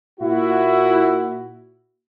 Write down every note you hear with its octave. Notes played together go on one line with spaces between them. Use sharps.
A#2 E4 F#4